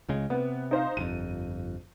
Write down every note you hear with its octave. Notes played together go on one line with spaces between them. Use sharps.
C#2 C#3 G#3
C3 B3
D#4 C5 F5
G1 F2 D#7